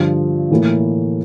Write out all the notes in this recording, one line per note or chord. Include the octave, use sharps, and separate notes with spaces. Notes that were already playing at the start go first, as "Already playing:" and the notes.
Already playing: G2 D3 F3
A2 E3 A#3 E4